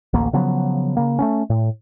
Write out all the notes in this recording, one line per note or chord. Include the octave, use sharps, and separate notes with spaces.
A1 D2 A#3
C#3 F3 F#3 B3
C#3 A#3
A3 B3 C#4
A2